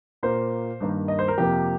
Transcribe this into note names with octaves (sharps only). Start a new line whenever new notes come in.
A#2 A#3 C5
G2 D#3 A#3
D#5
C5
A#4
F2 C3 F3 A#3 G4